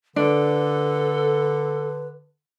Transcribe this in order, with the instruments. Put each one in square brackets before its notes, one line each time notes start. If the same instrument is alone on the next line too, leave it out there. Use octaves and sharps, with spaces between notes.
[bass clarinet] D3 [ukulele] D4 [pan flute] A4 [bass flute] B4